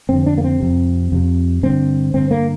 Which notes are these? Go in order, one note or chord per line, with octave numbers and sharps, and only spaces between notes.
F2 D3 C4
D4
A#3
C4
F2 C3
F2 C3
G2 D3 C4
G2 D3 C4
A#3